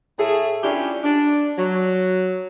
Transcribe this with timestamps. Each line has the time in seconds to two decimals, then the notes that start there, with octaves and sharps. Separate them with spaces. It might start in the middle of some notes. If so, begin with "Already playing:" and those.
0.18 A2 A3 G#4
0.63 C#4 D4 E4 F4 G4
1.04 D4
1.57 F#3